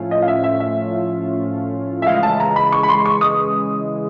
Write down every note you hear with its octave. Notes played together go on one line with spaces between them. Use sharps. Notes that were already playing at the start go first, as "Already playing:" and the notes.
Already playing: A2 F3 A3 C#4 F4
D#5
F5
E5
E5
E5
E5
C#3 E3 G#3 F5
A5
A#5
B5
C#6
B5
C6
C#6
D#6